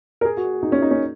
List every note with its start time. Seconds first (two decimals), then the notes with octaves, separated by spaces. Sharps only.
0.21 A#4
0.25 G#4
0.37 F#4
0.63 D#4
0.72 C#4
0.82 D#4
0.91 C#4